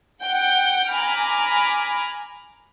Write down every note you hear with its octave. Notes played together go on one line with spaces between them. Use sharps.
F#5 G5 G6
G#5 A#5 B5 D6 F6